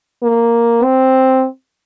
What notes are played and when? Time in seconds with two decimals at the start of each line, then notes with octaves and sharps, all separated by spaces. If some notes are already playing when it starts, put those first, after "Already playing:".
0.23 A#3
0.83 C4